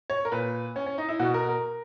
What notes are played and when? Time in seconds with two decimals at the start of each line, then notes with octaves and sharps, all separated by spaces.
0.10 C#5
0.25 A#4
0.32 A#2 B4
0.76 C#4
0.86 C#4
0.98 D#4
1.08 E4
1.19 B2 F#4
1.34 A#4
1.49 A#4